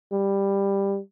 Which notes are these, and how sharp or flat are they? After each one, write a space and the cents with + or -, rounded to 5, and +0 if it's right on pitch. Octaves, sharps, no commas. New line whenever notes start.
G3 +10